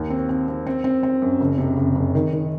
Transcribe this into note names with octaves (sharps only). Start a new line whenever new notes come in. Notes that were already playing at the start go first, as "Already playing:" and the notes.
Already playing: D#2
C4
C4
C4
C4
C4
C4
F#2
F#1
C3
F#1
F#1
D#3
D#3